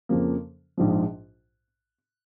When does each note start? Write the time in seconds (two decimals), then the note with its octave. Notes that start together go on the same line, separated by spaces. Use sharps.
0.09 F2 C#3 F3 A#3
0.78 A#1 G#2 F3